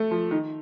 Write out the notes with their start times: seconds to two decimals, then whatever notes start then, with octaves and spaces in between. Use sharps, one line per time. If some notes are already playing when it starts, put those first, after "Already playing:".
Already playing: A3
0.11 F3
0.31 D#3